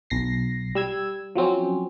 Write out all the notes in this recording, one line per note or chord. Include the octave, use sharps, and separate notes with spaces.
B1 A#6 C7
G3 E6 G#6
F3 F#3 C4 C#4